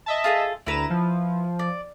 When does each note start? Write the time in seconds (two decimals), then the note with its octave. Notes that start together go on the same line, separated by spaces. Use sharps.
0.06 D#5 E5 A5
0.24 F4 G#4 A4
0.67 D2 E4 B4 A#5 E7
0.90 F3
1.59 D5